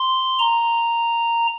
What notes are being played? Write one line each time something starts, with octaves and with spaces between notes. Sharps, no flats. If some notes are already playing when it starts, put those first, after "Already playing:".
Already playing: C6
A#5